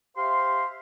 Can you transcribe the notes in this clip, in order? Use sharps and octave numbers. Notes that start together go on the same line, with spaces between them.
G4 C5 E5 F5 C6